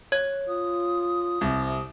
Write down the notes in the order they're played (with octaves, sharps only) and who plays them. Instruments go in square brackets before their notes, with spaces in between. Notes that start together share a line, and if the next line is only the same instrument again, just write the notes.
[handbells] C#5 [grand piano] G#6
[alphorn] F4 [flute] D#6
[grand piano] C2 [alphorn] C3